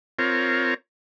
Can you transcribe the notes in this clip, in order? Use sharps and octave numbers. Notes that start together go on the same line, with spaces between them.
C4 F4 A#4 C#5